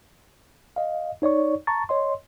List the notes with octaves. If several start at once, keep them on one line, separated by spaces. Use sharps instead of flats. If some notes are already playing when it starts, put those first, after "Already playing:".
D#5 F5
D#4 C#5 D5 C#6
A5 A#5 C#6 A6
C#5 D#5 C6